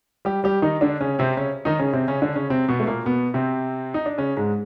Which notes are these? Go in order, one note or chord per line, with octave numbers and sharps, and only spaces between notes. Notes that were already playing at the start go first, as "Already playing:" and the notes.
G3 G4
G3 G4
D#3 D#4
D3 D4
C#3 C#4
C3 C4
C#3 C#4
D#3 D#4
C#3 C#4
C3 C4
C#3 C#4
D3 D4
C#3 C#4
C3 C4
B2 B3
A3
A#2 A#3
B2 B3
C3 C4
D#4
D4
C#3 C#4
G#2 G#3